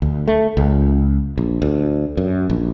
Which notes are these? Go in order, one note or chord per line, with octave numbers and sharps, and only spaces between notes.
D2
A3
C#2
A#1
D2
F#2
A#1